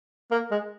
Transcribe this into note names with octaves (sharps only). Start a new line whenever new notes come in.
A#3
G#3